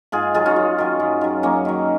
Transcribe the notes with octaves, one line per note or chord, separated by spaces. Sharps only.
G#2 F4 G#4
D#3 F#3 F4 G#4
C#4 F4
F#2
D#3 F#3
F#2
D#3 F#3
F#2 A#3 C#4
D#3 F#3